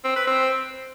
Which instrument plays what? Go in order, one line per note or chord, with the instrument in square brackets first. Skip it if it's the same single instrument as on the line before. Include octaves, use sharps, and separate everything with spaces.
[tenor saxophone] C4
B4
C4